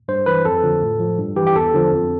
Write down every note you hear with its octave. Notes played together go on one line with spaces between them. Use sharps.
G2 C5
E3 B4
F2 A4
D3 F3
A2
F3
G2
E3 G4
G4
E2 A4
D3 F3
F2